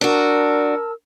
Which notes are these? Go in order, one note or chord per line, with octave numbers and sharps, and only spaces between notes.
D4 F#4 A#4 A5 E6